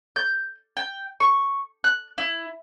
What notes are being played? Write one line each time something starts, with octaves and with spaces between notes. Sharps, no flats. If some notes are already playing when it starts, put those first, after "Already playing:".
G6
G5
C#6
F#6
E4